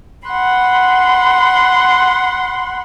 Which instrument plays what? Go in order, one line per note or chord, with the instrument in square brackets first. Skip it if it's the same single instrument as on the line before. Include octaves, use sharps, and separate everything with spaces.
[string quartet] F#5 B5 C6